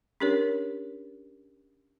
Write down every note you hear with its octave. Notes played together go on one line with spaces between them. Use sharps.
C#4 D4 G4 A#4 C#5